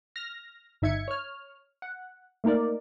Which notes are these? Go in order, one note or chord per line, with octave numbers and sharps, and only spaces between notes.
F6 A#6
G1 D#4 E5 G#6 C#7
C#5 F6
F#5
A3 A#3 D#4 A#4 D5